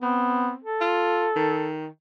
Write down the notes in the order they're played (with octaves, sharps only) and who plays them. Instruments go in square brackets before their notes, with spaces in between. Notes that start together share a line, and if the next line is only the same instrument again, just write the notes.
[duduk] B3 [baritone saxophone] C4
[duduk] A4
[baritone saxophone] F4
D#3